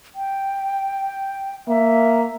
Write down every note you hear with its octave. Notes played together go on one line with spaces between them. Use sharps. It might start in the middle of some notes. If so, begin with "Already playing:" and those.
G5
A#3 E5